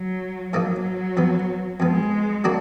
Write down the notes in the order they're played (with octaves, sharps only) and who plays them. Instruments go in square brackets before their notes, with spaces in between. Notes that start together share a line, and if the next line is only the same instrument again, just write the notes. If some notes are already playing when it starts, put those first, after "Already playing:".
Already playing: [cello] F#3
[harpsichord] G#2 F3 A#3 D#4 [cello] F#3
[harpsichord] F2 F3 B3
[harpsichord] F2 F3 B3 [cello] G#3
[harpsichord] F#3 A#3 D4 F#4